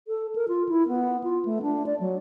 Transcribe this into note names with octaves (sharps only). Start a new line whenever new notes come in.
A4
A#4
F4
E4
B3
F4
A3
D4
D5
F#3